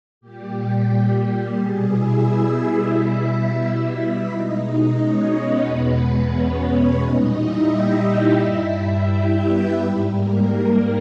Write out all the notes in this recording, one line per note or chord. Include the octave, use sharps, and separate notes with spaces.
A#2 G3 G4
G4
B2 G3 G#4
E4 E5
E4 E5
B2 G3
E4 E5
E4 E5
B2 G#3 D#4 D#5
C#4 C#5
B3 B4
E2 B2 G#3
C#4 C#5
A#2 G3 D#4 D#5
E4 E5
G4 G5
E4 E5
G2 G3 E4 E5
E4 E5
G4 G5
B3 B4
G#2 G3
A#3 A#4